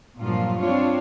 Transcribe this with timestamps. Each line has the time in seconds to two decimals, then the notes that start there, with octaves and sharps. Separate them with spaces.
0.20 G2 A#2 F3 F#3 F4
0.60 C4 D4 F4 C#5